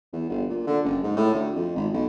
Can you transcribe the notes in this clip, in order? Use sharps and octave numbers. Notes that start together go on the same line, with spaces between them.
E2
G1
A#2
D3
F#1
G#2
A2
D2
F2
G#1
B1